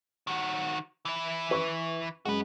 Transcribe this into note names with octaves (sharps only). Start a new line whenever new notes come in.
D#3 F#4
E3 E4
B4 C#6
F#2 G#3 F#4 B4